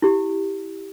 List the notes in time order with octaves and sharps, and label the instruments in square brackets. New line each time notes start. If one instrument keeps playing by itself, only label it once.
[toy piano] E4 G4